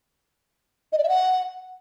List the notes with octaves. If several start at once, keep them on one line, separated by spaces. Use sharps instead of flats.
D#5
D5
E5
F#5